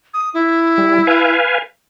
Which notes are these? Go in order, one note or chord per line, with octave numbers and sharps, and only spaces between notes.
D#6
E4
G3
B4 F5 G#5